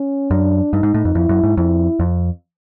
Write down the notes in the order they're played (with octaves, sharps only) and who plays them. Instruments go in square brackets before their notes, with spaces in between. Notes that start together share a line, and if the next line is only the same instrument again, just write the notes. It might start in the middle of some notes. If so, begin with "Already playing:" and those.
Already playing: [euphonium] C#4
[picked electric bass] F#2 [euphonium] D4
[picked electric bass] G2 [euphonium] D#4
[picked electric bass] G#2
A2
F2
[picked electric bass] F2 [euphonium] E4
[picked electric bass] F#2
G#2
[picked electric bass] F2 [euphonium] E4
[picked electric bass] F2